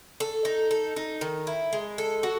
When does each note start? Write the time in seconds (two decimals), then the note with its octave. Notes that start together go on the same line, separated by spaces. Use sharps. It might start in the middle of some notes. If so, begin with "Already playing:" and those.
0.20 A4
0.45 D#4
0.71 A4
0.96 D#4
1.21 D#3
1.47 E4
1.73 G#3
1.98 A4
2.23 F#4